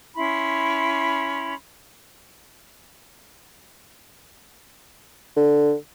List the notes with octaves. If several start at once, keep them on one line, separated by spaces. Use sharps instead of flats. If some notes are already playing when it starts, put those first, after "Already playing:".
C#4 E4 B5 C6
D3